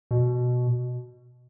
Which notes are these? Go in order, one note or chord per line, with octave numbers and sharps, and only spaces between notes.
B2